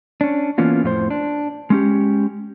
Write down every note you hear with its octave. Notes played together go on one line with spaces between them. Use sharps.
C#4 D4
E3 A#3 B3 C#4 F4
F2 A2 F4 C5
D4
G#3 C#4 G4